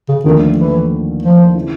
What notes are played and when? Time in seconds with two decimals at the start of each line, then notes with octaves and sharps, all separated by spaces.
0.09 C#3
0.24 D#2 D3 D#3 F3 A3
0.58 E3
1.22 F3
1.55 C#3 E3